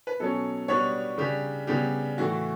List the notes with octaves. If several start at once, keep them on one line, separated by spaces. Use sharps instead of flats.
B4
B2 F#3 C#4 A4
B2 G3 B3 D4 C#5
C#3 G3 D4 G4
C#3 G3 B3 D4 G4
A2 E3 A3 F#4